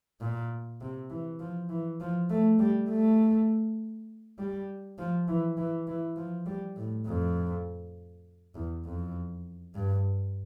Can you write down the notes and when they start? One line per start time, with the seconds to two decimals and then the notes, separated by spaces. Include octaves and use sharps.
0.21 A#2
0.81 C3
1.10 E3
1.39 F3
1.69 E3
2.00 F3
2.29 A3
2.59 G3
2.90 A3
4.38 G3
4.98 F3
5.28 E3
5.57 E3
5.88 E3
6.16 F3
6.46 G3
6.77 A2
7.06 F2
8.55 E2
8.85 F2
9.75 G2